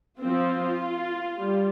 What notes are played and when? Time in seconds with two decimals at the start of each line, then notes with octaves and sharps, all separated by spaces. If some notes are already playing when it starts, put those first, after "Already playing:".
0.20 F3 C4 F4
1.39 G3